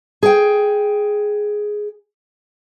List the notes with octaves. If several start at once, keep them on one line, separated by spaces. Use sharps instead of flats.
G#4 G5